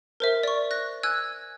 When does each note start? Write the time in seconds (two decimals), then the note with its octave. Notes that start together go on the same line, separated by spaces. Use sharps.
0.20 A#4 C5 E5
0.43 D5 C#6
0.71 F#6 A#6
1.03 G#5 E6 F#6 G#6